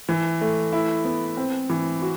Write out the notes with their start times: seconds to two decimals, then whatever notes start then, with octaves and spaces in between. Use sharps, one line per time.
0.09 E3
0.41 A3
0.73 E4
1.05 B3
1.37 C4
1.69 E3
2.02 F#4